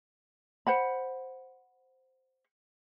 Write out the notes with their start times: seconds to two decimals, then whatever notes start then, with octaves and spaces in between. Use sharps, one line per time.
0.67 C5 F#5 B5